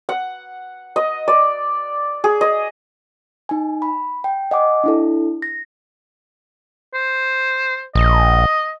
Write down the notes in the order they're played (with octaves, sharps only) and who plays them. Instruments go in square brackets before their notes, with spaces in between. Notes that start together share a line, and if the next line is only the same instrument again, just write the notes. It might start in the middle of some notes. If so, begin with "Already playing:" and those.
[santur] F#5
D#5
D5
G#4
D#5
[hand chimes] D#4 G#5
B5
G5
D#5 F#5 G#5 D6
D4 E4 A4
A#6
[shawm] C5
[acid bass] A#1 [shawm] D#5